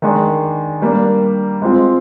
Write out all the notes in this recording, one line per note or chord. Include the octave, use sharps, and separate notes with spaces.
D#3 G#3 D4 G#4 D5
G3 A#3 D4
G#3 C4 F4